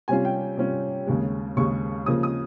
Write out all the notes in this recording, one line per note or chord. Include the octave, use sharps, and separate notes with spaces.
C3 G3 C#4 F4 G#5
G5
C3 G3 C#4 F4
D#2 C#3 G#3
D#2 C#3 G#3 C#6
C#3 F3 A#3 D#6
D#6